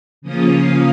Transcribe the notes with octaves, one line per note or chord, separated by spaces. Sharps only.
C#3 F3 A#3 C#4 F4 D#6
D#6